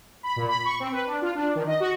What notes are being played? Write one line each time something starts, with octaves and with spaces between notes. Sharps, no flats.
B5
A#2
B5
C#6
C4
B4
D4
F4
D4
D#3
D#5
F#4